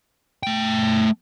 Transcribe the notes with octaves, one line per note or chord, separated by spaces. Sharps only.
A3 G5